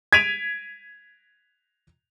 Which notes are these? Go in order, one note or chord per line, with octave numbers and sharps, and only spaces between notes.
G#6 B6 D7 D#7 F7